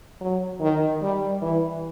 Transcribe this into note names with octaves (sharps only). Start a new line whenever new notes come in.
F#3
D#3
G3
E3